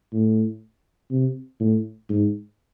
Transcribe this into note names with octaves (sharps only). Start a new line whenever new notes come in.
A2
C3
A2
G#2